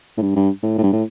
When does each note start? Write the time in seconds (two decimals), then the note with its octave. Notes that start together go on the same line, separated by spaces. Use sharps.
0.17 A2
0.22 G2
0.36 G2
0.63 A2
0.78 A2
0.83 G2
0.93 A2